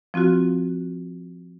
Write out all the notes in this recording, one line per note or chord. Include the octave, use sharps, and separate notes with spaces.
F3 C4 F4 F#4